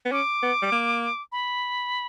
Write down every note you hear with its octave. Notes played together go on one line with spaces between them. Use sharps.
B3
C#4 D6
B3
G3
A#3
B5